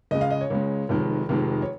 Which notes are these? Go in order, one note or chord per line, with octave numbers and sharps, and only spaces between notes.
C#2 C#3 G#3 D#5
F5
D#5
C#5
C#2 C#3 G#3
F1 F2 D#3 G#3
F1 F2 D#3 G#3
C#5